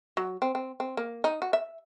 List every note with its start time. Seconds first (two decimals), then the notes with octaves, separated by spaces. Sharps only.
0.17 F#3
0.42 C4
0.55 C4
0.80 C4
0.97 A#3
1.24 D#4
1.42 F#4
1.53 E5